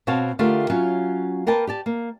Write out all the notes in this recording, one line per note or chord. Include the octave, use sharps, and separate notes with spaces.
B2 C4 F#4 C#5 F5 A5
D3 A3 F4 G4 A#4
F#3 C#4 F4
A#3 A#4 B4 G5 A5
G4 D5 A5
A#3